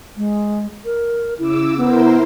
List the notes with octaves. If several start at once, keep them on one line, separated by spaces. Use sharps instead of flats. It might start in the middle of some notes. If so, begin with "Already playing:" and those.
G#3
A#4
C#3 E4 D6 E6
B3 E4 A#4 C5